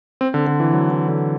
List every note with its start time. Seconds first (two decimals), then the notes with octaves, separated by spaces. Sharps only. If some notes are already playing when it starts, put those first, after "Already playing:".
0.21 C4
0.34 D3
0.47 D3
0.60 E3
0.73 F#3
0.90 E3
1.08 D3